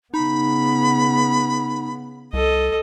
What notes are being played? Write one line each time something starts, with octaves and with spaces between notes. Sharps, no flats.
C#3 B3 D#4 B5
C2 A4 D#5